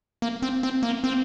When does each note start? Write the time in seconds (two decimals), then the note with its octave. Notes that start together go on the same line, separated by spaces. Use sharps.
0.22 A#3
0.42 C4
0.63 C4
0.83 A#3
1.04 C4